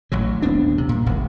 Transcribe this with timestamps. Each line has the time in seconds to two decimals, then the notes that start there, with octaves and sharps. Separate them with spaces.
0.12 A1 E3 F#3
0.42 D#1 B3 C4 D4
0.78 C3
0.89 A#2 G3
1.06 D#1 A1 E2